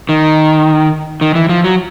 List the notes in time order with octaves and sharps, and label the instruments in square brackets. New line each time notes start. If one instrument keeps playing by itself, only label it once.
[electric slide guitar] D#3
D#3
E3
F3
F#3